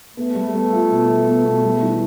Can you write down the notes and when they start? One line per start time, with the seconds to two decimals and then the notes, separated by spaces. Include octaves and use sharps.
0.17 A3 B3
0.35 G3
0.53 B3
0.72 F4
0.90 B2
1.08 B2
1.27 B3
1.45 B2
1.63 G3
1.82 E3